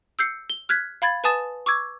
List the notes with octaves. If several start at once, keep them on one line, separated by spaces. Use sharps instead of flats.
E6 G6 C7 C#7
G7
F6 F#6 G#6 B6
F5 B5 G#6 A6
B4 G#5 A5 D#6 A6 E7
C#6 D6 E6 G#6